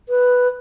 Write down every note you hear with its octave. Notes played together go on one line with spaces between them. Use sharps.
B4